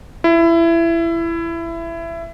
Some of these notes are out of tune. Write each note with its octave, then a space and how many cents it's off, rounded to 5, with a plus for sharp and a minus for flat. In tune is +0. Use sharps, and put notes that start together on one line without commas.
E4 +20